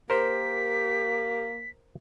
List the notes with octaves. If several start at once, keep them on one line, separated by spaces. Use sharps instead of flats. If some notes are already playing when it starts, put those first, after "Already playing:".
A#3 G4 A#4 C5 B6